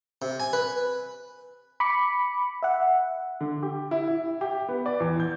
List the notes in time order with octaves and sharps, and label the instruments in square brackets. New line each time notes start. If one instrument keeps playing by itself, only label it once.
[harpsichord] C3
G#5
B4
[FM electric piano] B5 D6 C#7
E5 F#5
[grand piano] D3
G4
E4
E4
G4
B3
D5
E2
G6